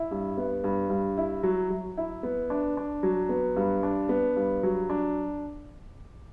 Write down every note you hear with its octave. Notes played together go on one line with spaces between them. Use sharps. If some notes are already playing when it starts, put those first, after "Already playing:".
Already playing: E4
G2
B3
G2
G2
E4
F#3
F#3
E4
B3
D4
D4
F#3
B3
G2
D4
B3
G2
F#3
D4